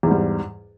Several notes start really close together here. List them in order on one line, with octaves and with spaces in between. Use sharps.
E2 G#2 G3